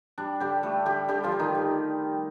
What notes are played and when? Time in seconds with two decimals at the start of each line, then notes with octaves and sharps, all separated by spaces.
0.18 G3 D4
0.40 D3 G3 G4
0.63 G3 A3 A4
0.85 D3 G3 G4
1.08 D3 G3 G4
1.23 F3 F4
1.32 G3
1.39 D#3 D#4
1.55 G3